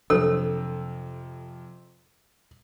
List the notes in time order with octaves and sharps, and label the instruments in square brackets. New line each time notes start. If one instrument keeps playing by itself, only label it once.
[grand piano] F2 C3 [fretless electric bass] F#3 D4 [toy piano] A4 C#5 [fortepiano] E6